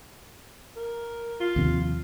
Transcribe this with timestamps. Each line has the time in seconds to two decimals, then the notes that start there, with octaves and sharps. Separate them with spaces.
0.76 A#4
1.40 F4
1.56 D#2 C3 F3